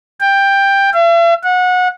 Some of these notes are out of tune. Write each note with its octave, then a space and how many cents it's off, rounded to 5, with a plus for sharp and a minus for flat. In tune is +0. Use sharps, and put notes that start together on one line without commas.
G5 +10
E5 +45
F#5 -25